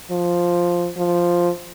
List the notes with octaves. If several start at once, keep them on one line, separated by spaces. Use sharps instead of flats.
F3
F3